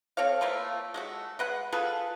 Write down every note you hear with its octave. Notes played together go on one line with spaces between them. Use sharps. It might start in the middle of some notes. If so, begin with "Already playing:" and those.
C4 A4 C#5 F5
A3 A#3 F4 B4
G#3 A3 F#4
G#3 B4 F#5
F4 G#4 A4 B4